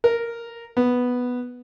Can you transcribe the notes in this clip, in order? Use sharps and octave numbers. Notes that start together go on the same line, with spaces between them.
A#4
B3